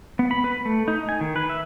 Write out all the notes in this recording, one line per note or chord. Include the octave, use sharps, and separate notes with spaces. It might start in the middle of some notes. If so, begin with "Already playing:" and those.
B3
B5
B4
A3
D#4
G#5
D#3
B4
E5